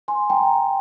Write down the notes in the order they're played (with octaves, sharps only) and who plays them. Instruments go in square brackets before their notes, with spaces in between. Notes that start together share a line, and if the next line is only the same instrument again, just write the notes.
[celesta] G#5 C6
G5 A#5